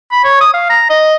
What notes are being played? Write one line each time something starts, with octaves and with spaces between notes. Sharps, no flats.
B5
C#5
D#6
F5
A#5
D#5